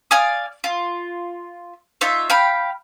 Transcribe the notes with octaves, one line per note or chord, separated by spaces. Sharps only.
D5 F5 G#5 D#6
F4
D#4 F4 C#5 E5
F5 G5 B5